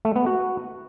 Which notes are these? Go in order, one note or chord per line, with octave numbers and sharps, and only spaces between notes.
A3
B3
F#4